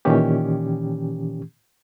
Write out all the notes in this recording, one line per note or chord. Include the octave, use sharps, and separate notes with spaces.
A#2 D#3 E3 C#4 G4